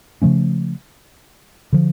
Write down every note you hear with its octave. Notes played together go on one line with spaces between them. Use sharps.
C#3 F3 A3 C#4
D3 F3